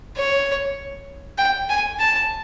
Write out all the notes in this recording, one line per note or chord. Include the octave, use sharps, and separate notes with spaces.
C#5
G5
G#5
A5